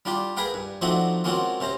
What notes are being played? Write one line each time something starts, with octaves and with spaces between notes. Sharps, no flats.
G3 D4 F4 G4
G#4 A#4 B4 F5 G5
G2
F3 A3 C4 D4 D#4 F#4
G#3 A#3 C4 C#4 F4 F#4
C3 C#4 C5 A#5